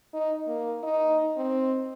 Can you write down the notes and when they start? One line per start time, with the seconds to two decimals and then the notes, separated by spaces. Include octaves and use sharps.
0.14 D#4
0.48 A#3
0.83 D#4
1.37 C4